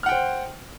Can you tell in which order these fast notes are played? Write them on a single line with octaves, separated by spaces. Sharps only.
F6 F#5 G5 C5